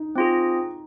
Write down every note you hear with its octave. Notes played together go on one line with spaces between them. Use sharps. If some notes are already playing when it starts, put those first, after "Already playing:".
Already playing: D#4
C4 F4 G#4